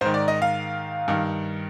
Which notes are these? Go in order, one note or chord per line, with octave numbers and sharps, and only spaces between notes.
G#2 D#3 C5
D5
D#5
F5
G2 D#3